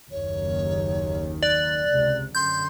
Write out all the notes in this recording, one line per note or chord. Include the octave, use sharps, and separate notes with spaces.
F#1 D#2 D#3 C#5
D5 F#6
C#2 C3
F#2 D3 C6 G6